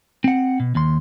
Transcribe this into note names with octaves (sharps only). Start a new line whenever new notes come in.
C4 F#5
B2
D#2 C6